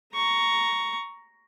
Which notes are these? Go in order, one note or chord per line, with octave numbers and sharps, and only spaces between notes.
A#5 C#6